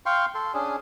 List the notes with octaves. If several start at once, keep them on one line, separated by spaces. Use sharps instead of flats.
F5 G5 C6 C#6
A4 C6
C#4 D4 G#4